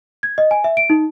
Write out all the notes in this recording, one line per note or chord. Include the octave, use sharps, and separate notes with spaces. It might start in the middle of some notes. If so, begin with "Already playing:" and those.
G#6
D#5
G#5
E5
D7
D#4